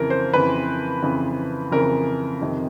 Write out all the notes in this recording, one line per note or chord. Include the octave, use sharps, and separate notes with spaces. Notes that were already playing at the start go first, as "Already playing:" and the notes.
Already playing: F2 C#3 E3 A#4
C5
F2 C#3 E3 B4
F2 C#3 E3
F2 C#3 E3 A#4
F2 C3 D#3